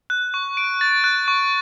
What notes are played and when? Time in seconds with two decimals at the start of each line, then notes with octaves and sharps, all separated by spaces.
0.10 F#6
0.34 C#6
0.57 D7
0.81 A6
1.04 F#6
1.28 C#6